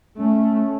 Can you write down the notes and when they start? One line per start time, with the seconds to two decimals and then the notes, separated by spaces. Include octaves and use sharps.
0.17 A3 C#4